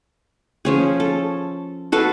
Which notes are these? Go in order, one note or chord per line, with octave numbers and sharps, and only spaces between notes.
F3 C#4 G#4
A4
F#4 A4 B4 F5